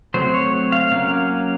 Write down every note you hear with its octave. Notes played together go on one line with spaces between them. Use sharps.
F#3 A3 C4 C5
C#5
F5
F#3 A#3 C#4 F5